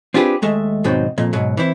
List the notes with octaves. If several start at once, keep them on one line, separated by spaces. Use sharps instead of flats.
C4 D4 F4 G4 G#4 B4
D#2 G#3 A3 E5
D#2 G#2 B2 F#3 C4 D#4
F2 A#2
G#2 B2 F#3
E3 C4 E4